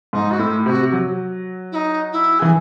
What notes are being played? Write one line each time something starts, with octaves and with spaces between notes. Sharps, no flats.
G#2 D#4
F#4
A2 E4
C3 F#4
F#3
E4
D#4
E4
E3 G#4